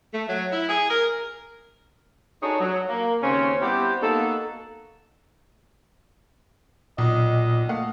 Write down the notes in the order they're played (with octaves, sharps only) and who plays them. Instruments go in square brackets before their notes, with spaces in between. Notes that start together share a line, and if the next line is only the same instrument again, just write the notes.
[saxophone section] A3
F#3
E4
G#4
A#4
D4 D#4 F#4 G#4 A4 C#5
F#3
A#3
D#2 C#3 C4 C#4
G3 B3 C4 E4 G4
A#3 B3 D#4 F#4 A4
[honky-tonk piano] B1 [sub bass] A#2 [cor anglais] D#5
[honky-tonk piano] A3 F5 F#5